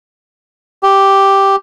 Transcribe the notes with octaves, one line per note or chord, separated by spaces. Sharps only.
G4